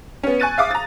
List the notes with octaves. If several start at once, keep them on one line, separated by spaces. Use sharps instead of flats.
B3 C#4
G#5 C#6 F#6 A6 D#7
E5 F5 D6 D#6
A#5 A6